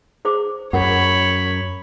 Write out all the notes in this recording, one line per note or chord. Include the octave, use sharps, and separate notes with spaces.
G#4 C5 D6
F#2 A#4 C#5 F#5 B5